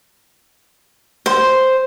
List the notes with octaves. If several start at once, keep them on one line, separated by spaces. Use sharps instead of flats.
C5